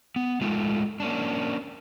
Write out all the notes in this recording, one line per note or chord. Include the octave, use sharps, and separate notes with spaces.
B3
G#3 A3 D#4 F4
A#3 C#4 D4